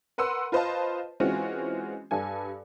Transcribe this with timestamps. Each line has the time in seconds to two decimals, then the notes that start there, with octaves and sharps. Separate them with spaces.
0.18 A#4 B4 F#5 C6 E6
0.52 F4 B4 C5 D#5 F5 A5
1.20 E3 G#3 C4 C#4 F4 F#4
2.11 G2 G3 A4 G#5